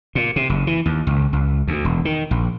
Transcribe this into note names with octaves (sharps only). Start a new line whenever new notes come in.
A#2
C3
F#1
E3
D#2
C#2
C#2
D2
E1
D#3
A#1